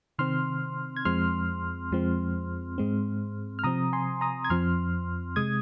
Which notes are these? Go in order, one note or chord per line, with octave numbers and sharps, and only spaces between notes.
C3 D#3 C4 C6 F6
G#6
F2 F3 G#3 C4 C6 F6
F2 F3 G#3 C4
G#2 G#3 C4
F6
C3 F3 C4 A#5 D#6
G#5 C6
A#5 D#6
G#6
F2 F3 C4 C6 F6
C3 G#3 D#6 G#6